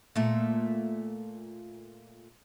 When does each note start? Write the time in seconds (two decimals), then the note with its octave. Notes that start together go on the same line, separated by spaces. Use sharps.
0.16 A#2 A3